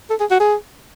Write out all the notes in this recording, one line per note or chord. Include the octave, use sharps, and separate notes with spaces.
A4
G#4
F#4
G#4